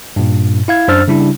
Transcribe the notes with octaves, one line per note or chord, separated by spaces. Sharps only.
G2 A#2
E4 F5 G#6
F#2 D4 C5 E6 F6 A6
C#3 G3 D4 E4